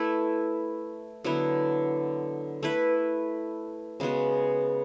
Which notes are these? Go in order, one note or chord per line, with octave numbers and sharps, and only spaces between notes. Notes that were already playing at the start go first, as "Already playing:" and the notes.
Already playing: A3 E4 B4
D3 F#3 B3 E4
A3 E4 B4
C#3 G#3 B3 F#4